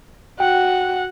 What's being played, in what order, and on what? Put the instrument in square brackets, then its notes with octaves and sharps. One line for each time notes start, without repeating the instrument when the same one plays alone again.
[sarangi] F#4 [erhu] F#5 [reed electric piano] G5